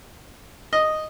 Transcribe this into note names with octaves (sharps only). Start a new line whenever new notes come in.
D#5